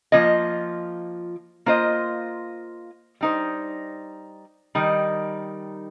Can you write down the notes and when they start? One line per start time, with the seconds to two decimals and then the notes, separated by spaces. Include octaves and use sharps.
0.12 F3 A#3 F4 D#5
1.66 A#3 F4 C5 D#5
3.21 G3 D#4 C5
4.75 D#3 G3 D#4 A#4